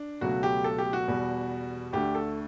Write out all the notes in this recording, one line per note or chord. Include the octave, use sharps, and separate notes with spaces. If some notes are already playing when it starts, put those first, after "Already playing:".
Already playing: D4
C#2 B2 F#3 A3 F#4
G4
A4
G4
F#4
E2 B2 G3
D2 D3 A3 G4
A4